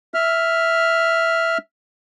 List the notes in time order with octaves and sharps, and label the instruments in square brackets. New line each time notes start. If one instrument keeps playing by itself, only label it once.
[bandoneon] E5 F6